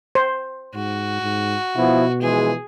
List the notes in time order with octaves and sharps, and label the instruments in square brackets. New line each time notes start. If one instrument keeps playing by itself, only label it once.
[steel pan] C5
[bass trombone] G#2 [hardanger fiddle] F#4
[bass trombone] G#2
[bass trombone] B2 [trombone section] F3 B3 E4
[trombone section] E3 F3 G#3 [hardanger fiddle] G#4